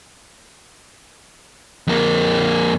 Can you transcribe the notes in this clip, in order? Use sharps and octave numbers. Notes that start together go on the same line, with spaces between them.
F2 A#3